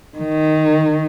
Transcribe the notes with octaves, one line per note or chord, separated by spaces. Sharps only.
D#3